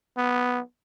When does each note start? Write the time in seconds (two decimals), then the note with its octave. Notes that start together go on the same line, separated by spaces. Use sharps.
0.17 B3